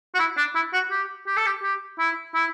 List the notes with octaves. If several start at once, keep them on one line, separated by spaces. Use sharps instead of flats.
F#4
E4
D4
E4
F#4
G4
G4
A4
G4
G4
E4
E4